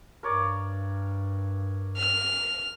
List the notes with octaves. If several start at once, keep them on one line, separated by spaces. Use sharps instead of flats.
G2 A#4 C#5 D5
F6